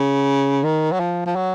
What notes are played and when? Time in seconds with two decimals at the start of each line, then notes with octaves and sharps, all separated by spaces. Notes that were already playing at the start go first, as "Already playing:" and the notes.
Already playing: C#3
0.64 D#3
0.92 F#3
1.00 F3
1.26 F3
1.36 F#3